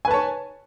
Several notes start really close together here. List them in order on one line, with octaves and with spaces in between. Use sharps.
G#5 B4 A5 C#5